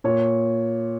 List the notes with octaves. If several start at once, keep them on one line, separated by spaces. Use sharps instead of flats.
A#2 C#5